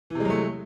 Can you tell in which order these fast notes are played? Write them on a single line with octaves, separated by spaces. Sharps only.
E3 C3 G#3 F#3 A3